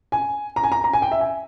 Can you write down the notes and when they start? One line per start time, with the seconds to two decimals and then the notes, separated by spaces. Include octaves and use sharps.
0.12 G#5
0.56 A#5
0.64 G#5
0.72 A#5
0.84 A#5
0.93 G#5
1.02 G5
1.12 E5
1.21 G#5